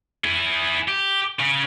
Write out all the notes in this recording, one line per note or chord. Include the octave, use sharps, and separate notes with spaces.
E4 G#4
G4
C#3